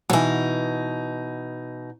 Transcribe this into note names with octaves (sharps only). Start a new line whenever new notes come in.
B2 E3 F#3 D#4